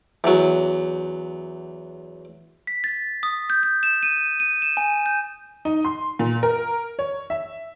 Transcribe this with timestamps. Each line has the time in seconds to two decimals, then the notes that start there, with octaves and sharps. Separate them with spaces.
0.24 E2 F#3
2.67 B6
2.84 A6
3.23 D#6
3.50 G6
3.63 G6
3.83 E7
4.03 D#7
4.40 D#7
4.62 E7
4.77 G#5
5.06 G6
5.65 D#4
5.85 C6
6.19 A#2
6.43 A#4
6.99 C#5
7.30 E5